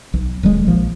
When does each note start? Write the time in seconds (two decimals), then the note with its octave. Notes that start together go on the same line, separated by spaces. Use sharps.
0.14 B1
0.43 D#1 F#3 G#3
0.66 A#1 F3